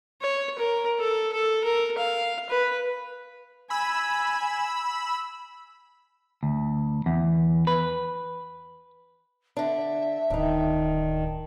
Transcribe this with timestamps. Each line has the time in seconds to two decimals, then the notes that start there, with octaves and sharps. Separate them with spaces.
0.21 C#5
0.59 A#4
1.00 A4
1.33 A4
1.64 A#4
1.98 F5
2.50 B4
3.70 G#5 B5 E6
6.43 D2
7.06 E2
7.67 B4
9.57 D3 D4 E5
10.30 D1 D#3 D4 D#4